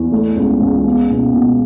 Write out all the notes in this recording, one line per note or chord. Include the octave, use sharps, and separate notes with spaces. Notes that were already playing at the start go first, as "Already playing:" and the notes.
Already playing: E2
A3
C#2
C#2
B3
B2
B2